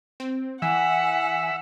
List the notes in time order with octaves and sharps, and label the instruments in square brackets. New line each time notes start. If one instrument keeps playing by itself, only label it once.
[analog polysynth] C4
[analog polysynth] E3 [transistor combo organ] E5 [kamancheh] F#5 [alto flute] G#5